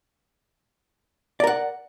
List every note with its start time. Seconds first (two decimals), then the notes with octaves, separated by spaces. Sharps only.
1.40 D5
1.44 A#4
1.47 F#5